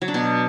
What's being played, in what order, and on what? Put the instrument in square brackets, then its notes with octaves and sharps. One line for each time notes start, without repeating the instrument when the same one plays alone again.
[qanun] F#3
D4
B2